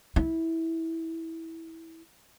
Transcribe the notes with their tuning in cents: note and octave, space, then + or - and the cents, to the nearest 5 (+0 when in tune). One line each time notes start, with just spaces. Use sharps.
E4 -15